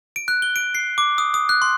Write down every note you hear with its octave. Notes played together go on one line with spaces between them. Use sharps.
D7
F#6
G7
D7
C7
D6
D#6
D#6
F#6
C6